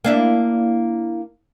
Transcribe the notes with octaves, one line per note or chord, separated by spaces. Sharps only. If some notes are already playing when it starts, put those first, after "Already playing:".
A#3 D4 E4